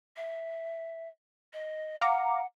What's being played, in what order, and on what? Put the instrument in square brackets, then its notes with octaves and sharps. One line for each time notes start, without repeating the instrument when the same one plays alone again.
[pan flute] E5
D#5
[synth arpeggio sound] F5 A#5 D6 [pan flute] F#5